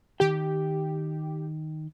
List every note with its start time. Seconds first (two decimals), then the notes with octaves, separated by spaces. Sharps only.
0.20 D#3 G4 G5